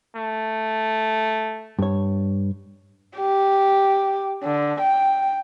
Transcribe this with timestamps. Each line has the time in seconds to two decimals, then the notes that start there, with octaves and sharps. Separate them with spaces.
0.16 A3
1.79 G2 C#5
3.16 G4
4.43 D3
4.81 G5